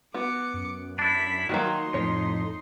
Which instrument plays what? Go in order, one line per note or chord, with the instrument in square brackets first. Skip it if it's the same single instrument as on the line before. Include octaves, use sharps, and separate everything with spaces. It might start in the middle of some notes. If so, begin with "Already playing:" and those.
[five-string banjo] B3 F#4 [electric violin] D6 C#7
[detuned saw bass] F#2
[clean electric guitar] D4 E4 [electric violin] B5 B6
[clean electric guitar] D#3 [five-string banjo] F#3 A#3 F#4 [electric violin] D#4 C6
[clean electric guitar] F2 [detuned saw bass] A2 [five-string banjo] C#5